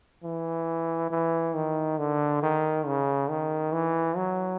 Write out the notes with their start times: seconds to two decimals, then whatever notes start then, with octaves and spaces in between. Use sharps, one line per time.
0.24 E3
1.11 E3
1.56 D#3
1.99 D3
2.43 D#3
2.86 C#3
3.30 D#3
3.73 E3
4.17 F#3